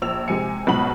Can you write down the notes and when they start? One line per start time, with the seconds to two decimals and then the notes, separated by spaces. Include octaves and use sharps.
0.02 A#1 E6 F7
0.28 C3 G#3 G#5 C#7
0.67 B1 G#2 B2 B5 F#7